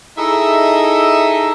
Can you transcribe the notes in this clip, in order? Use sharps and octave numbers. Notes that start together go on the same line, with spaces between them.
D#4 E4 G#4 A4 D#5 E5